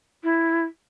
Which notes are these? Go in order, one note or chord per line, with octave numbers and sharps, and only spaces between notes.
E4